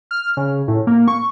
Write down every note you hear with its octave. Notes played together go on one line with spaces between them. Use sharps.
F6
C#3
A2
A#3
C#6